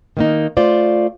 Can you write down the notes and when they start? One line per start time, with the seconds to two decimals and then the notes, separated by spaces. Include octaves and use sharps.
0.17 D#3 A#3 D#4
0.57 A3 F4 C5 D5